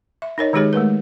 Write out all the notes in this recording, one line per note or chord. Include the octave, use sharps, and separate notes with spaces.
E5
D#4 A#4 C#5 D#5
D#3 G#3 D#4 G4 G#4 C#5
G#3 A3 A#4 B4